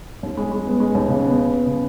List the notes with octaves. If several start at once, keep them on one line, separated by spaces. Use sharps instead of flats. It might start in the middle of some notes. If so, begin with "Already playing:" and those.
D#2
G#3
G#3
B3
G#3
D#2
C#3
B3
C#3
B3
C#3